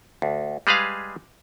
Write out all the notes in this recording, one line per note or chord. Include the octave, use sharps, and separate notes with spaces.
D2
G3 G#3 G#4 B4 F5